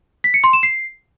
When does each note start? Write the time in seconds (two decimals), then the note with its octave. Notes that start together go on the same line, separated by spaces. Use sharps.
0.24 B6
0.34 C#7
0.44 C6
0.53 E7
0.63 C7